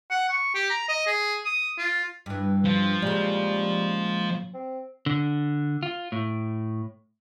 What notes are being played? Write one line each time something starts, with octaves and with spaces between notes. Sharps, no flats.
F#5
C#6
G4
A#5
D#5
G#4
D#6
F4
G2 E3
F3
A#2 C#3 G3 G#3
C4
D3
F4
A2